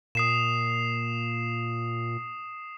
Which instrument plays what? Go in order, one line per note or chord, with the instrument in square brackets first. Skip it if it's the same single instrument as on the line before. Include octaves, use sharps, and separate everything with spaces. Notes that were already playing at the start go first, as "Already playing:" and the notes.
[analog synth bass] A#2 [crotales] D#6 C7 E7